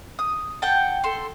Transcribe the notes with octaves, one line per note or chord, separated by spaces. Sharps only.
D#6
F#5 G5 A5
A4 C6